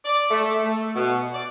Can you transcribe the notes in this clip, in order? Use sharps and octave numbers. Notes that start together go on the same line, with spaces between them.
D5
A3
A3
B2
D5